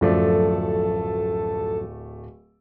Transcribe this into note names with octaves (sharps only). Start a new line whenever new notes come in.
D1 F#2 F3 A3 A4 D5